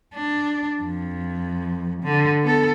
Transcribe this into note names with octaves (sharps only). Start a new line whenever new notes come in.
D4
F2
D3
B3 A4